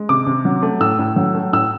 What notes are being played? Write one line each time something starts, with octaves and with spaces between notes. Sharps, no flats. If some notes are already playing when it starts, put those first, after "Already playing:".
Already playing: G#3
C3 D6
C3
F#3
A3
A2 E6
A2
F#3
A3
A2 E6